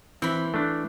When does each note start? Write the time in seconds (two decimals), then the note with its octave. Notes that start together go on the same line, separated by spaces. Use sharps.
0.22 E3 C4 B5
0.54 A3 D4